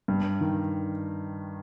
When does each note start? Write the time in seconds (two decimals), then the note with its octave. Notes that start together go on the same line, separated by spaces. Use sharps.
0.08 G2
0.41 D#3